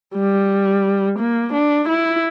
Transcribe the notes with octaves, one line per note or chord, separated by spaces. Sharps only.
G3
A#3
D4
E4